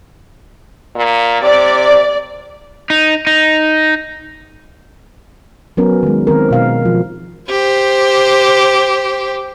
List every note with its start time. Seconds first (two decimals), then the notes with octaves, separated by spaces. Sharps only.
0.96 A#2
1.42 C3 D5
2.90 D#4
3.27 D#4
5.77 F#3 B3 C#4 A#4
6.03 D#3 G#3
6.27 D#3 C4 A#4
6.51 B2 F5
6.85 F3
7.50 G4 C5